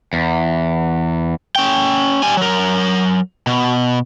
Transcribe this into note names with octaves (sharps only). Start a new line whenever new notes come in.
E2
C#4 G5
G3 G#5
F#3 A#4
B2